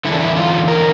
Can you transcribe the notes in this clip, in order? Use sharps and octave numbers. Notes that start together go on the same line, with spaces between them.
E2 D3 D4 E4
E4
F4
A#4